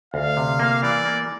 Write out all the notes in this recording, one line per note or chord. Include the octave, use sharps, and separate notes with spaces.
D2 F5
C3
A#3
E3 D5
A#3